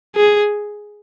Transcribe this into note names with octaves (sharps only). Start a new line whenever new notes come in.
G#4